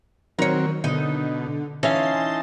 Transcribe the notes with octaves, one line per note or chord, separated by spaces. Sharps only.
D#3 F#3 C4 A#4 C#5
B2 D3 D#4
E3 C#4 D#4 F5 A5 C6